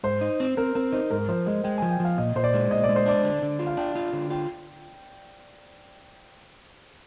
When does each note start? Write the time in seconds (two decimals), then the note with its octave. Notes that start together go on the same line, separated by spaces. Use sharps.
0.03 G#2 C5
0.21 D#4
0.40 C4
0.57 C4 A#4
0.75 C4 A#4
0.92 D#4 C5
1.11 G#2 A#4
1.28 F3 C5
1.46 G#3 D#5
1.64 G#3 G5
1.78 F3 G#5
1.91 G5
2.00 F3 F5
2.18 A#2 D#5
2.36 A#2 C5
2.44 D5
2.54 G#3
2.71 A#2 D#5
2.84 D5
2.89 G#3
2.96 C5
3.06 D4 D5
3.24 D3
3.42 D3
3.59 F4
3.67 F5
3.77 D4 G5
3.96 F4
4.13 D3
4.30 F4 G5